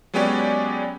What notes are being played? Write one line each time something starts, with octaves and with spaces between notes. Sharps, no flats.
F#3 G#3 B3 C#4 G4 D5